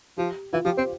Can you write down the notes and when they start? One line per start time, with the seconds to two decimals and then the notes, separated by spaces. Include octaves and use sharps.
0.18 F3 G4
0.53 E3 F4
0.65 F3 G4
0.77 C4 C5